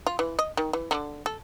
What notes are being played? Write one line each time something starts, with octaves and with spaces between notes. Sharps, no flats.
F4
E3
D#5
D#3
E3
D3
A4